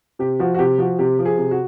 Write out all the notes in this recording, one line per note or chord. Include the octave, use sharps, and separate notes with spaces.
C3 G4
F3 F#4
F#4
C3 G4
F3 F#4
C3 G4
F3
G#4
C3
F#4